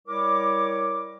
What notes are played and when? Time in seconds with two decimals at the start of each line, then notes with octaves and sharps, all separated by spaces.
0.08 G3 E4 A#4 C#5 D6